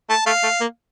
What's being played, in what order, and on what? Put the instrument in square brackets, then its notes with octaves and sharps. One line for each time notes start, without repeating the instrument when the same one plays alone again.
[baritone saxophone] A3 [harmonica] A5
[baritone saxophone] A3 [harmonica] F5
[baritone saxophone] A3
A#3